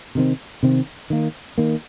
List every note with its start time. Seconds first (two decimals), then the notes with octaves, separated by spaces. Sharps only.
0.15 C3 D#3 C4
0.63 C3 D#3 C4
1.10 D#3 A#3
1.58 D#3 A#3